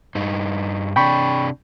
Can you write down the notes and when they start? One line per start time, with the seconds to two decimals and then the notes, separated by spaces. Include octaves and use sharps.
0.15 G2 D#4
0.96 C3 D4 G5 B5 C#6